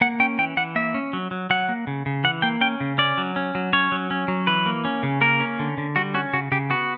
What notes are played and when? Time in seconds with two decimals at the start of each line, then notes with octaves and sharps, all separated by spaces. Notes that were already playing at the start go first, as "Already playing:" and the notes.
0.01 A#3 F#5
0.20 C#4 G5
0.39 E3 G5
0.57 E3 F#5
0.75 A#3 E5
0.94 C#4
1.13 F#3
1.31 F#3
1.50 F#3 F#5
1.69 A#3
1.87 C#3
2.06 C#3
2.24 E3 F#5
2.42 A#3 G5
2.61 C#4 G5
2.80 C#3
2.98 C#4 D5
3.18 F#3
3.36 C#4
3.55 F#3
3.73 C#4 C#5
3.92 F#3
4.11 C#4
4.28 F#3
4.47 E3 B4
4.66 A#3
4.85 C#4
5.03 C#3
5.21 A#3 A#4
5.40 C#4
5.59 D3
5.78 D3
5.96 G3 F#4
6.14 C#4 F#4
6.33 C#3 F#4
6.52 C#3 G4
6.70 B3 F#4